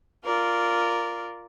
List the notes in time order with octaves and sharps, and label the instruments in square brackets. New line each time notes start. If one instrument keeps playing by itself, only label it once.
[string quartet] F4 A#4 D5